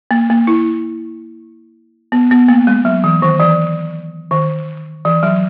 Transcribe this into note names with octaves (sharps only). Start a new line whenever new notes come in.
A#3
A#3
E4
B3
B3
A#3
G#3
F#3
E3
D#3
E3
D#3
E3
F#3